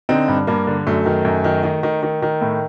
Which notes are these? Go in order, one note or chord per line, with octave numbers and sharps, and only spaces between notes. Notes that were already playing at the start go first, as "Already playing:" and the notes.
D3 C4 D#4
G2
G2 A#3
D3
F#2 A3
D#3
F#2
D#3
D#3
D#3
D#3
D#3
A2